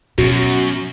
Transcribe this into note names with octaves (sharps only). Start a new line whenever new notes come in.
F#2 B2 F#4